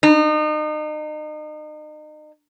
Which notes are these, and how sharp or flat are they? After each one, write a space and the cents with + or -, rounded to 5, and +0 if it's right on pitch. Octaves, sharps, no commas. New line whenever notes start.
D#4 -35